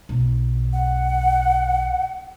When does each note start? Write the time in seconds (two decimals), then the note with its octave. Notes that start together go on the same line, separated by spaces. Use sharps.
0.09 B1
0.73 F#5